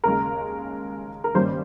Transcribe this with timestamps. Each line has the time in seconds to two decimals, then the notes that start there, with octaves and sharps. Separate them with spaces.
0.04 D#2 C#3 G#3 A#4
1.24 A#4
1.35 G2 D#3 G3 A#3 C#4 C5